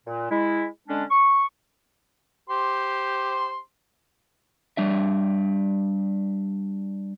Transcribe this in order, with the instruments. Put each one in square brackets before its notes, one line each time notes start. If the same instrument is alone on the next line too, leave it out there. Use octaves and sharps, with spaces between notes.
[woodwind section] A#2
G#3 E4
D3 G#3 C#4 D4
C#6
[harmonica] G4 C5 C6
[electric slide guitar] G3 D4 E5